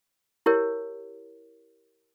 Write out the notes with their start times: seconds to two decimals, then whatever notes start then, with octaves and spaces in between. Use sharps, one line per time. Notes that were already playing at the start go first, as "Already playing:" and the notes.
0.46 E4 G4 A#4 C#5